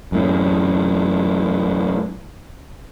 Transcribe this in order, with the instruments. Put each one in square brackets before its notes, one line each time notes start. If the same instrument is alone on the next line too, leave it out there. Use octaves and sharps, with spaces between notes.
[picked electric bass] F#2 A2